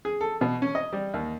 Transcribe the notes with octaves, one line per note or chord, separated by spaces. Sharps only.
G#4
A4
B2
C#4
D#5
G3
D#2